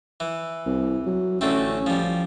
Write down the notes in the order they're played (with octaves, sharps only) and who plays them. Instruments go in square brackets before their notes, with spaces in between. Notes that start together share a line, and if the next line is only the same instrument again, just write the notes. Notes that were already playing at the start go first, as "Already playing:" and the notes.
[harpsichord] E3
[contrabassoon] C2
F#3
[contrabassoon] A1 [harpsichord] D3 A3 C4 [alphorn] C#4
[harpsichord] F3 G3